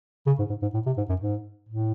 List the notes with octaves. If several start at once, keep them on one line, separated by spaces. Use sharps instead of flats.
C#3
G#2
G#2
G#2
A2
C3
G#2
F#2
G#2
A2